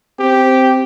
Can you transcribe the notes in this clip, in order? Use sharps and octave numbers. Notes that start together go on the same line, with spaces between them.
C4 G4